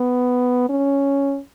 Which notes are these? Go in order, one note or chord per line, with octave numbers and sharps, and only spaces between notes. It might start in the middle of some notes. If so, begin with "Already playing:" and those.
Already playing: B3
C#4